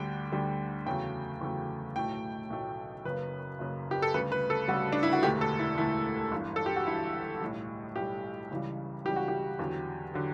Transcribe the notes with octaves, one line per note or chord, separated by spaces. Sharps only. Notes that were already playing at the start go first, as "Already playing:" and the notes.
Already playing: D2 D3 G3 G5
D2 D3 G3
E2 C#3 F#3 A3 G5
E2 C#3 F#3 A3
B1 A2 F#3 A3 G5
B1 A2 F#3 A3
F#1 F#2 C#3 B4
F#1 F#2 C#3
G4
A4
D2 C#3 G3 B4
B4
A4
D2 C#3 G3 F#4
D4
E4
F#4
E1 D2 D3 A3 G4
A4
E4
E1 D2 D3 A3 E4
G1 G2 E3
A4
G4
F#4
G1 G2 E3 E4
B1 A2 G3
B1 A2 G3 G4
C#2 C#3 E3 G3
C#2 C#3 E3 G3 G4
F#4
G4
E2 D3 F#3
D3 F#3